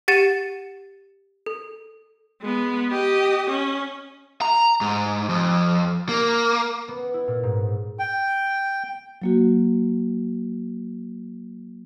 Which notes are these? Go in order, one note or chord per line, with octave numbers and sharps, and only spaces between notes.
G4 F#5 A6 C#7 D#7 E7
A4
G#3 B3
G4 D#5
C#4
A#5
G#2
F2
A#3
B3
E4
A#2
G#2
G5
F#3 A#3 F#4